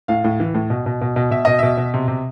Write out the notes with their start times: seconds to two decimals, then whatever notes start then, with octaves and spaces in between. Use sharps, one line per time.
0.08 A2 F5
0.24 A2
0.40 E3
0.54 A2
0.70 B2
0.86 B2
1.01 B2
1.16 B2
1.31 B2 E5
1.45 B2 D#5
1.59 B2 E5
1.77 B2
1.94 C3
2.08 C3